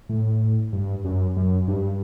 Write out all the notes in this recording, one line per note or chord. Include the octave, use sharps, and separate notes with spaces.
A2
G2
F#2
F#2
G2